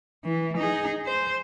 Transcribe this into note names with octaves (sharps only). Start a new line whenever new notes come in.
E3
D#4 G#4
C5